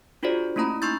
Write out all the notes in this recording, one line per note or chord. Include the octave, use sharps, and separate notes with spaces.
D4 F4 F#4 G#4 C5 D5
A3 A#3 C#4 E4 A#5 B5
D#4 C6 C#6 E6 G6 A6